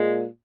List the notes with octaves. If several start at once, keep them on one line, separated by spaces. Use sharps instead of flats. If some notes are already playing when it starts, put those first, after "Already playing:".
Already playing: A#2 G#3